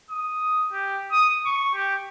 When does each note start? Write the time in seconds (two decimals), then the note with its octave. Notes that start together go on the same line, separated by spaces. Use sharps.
0.10 D#6
0.72 G4
1.12 D#6
1.45 C#6
1.74 G4